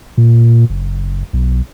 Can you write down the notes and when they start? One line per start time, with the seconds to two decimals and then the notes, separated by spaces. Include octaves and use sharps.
0.18 A#2
0.70 F#1
1.33 B1